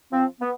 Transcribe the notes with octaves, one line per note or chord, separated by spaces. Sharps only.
F3 C4
B3